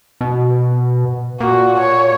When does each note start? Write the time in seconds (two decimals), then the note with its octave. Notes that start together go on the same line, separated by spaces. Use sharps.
0.21 B2
1.40 A#2 F#4
1.79 C#5